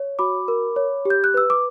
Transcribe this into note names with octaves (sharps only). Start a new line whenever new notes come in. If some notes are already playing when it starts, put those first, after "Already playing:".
Already playing: C#5
F#4 B5 D6
A#4
C#5
G4 G6
F#6
B4 E6
D6